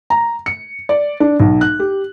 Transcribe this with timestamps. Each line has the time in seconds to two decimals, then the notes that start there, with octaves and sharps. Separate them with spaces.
0.10 A#5
0.46 C#7
0.89 D5
1.20 D4
1.40 B1
1.61 F#6
1.79 G4